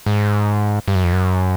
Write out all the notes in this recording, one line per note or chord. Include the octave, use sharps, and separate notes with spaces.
G#2
G2
F#2
F2
F#2